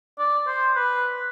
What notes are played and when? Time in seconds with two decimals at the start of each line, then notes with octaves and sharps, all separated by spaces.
0.19 D5
0.47 C5
0.76 B4